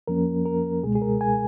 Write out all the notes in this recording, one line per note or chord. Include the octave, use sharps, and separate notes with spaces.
F2 F3 A#3 C#4 A#4
A#4
C#2 B2 G#3 G#4
G#4
A#4
G#5